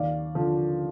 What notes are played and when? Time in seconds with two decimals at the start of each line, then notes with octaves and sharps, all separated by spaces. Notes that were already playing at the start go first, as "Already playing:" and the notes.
Already playing: D#2 D5 F5
0.35 D3 F3